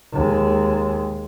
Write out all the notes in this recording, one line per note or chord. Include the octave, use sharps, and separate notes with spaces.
D#2 G#3